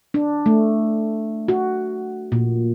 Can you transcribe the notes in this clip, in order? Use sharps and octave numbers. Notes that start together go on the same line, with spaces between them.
D4
A3
F#4
A#2